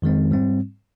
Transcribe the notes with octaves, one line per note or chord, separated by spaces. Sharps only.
F2 D#3 G#3 C4
G#2 G3 C4